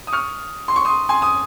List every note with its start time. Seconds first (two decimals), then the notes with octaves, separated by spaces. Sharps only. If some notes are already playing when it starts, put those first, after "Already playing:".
0.07 D#6
0.12 C#6 F6
0.68 C6
0.76 C#6
0.85 C6 D#6
1.09 G#5 C6
1.22 D#6